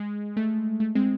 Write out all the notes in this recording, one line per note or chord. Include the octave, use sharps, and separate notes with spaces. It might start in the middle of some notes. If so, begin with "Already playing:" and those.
Already playing: G#3
A3
A3
G#3 C4